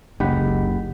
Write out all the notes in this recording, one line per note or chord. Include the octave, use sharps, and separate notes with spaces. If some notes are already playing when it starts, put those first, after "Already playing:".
F#1 C#2 D#4 G4 F#5 B5